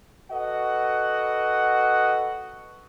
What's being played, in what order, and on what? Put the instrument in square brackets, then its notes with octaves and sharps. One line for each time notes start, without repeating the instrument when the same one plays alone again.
[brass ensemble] F#4 A4 B4 D#5 F#5